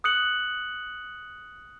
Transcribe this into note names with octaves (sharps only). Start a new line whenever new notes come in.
D#6 F#6 C#7 F#7